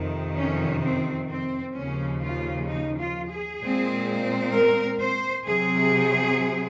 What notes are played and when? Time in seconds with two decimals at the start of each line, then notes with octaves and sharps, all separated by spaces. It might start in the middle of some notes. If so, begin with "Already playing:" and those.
Already playing: F2 C3 D#3
0.36 C#4
0.82 C4
1.28 C4
1.75 D#2 C#3 F3 C#4
2.21 F4
2.68 D#4
2.99 F4
3.29 G#4
3.61 A#2 G#3 C4
4.53 A#4
5.00 C5
5.46 C3 F#3 C4 G#4